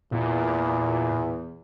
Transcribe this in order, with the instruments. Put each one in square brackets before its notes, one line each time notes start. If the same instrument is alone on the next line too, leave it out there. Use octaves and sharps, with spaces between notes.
[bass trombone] E2 [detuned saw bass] A#2